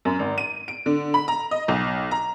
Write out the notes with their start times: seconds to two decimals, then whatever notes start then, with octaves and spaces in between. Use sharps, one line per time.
0.05 F#2
0.19 G#1
0.38 D#7
0.68 D7
0.86 D3
1.14 B5
1.28 A#5
1.51 D#5
1.68 B1
2.11 A#5